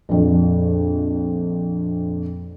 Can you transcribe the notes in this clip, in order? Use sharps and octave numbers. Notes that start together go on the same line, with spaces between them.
A#1 F2